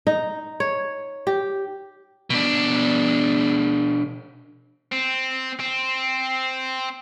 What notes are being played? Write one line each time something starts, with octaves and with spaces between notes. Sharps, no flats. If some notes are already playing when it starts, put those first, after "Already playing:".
D#4
C#5
G4
B2 D4
C4
C4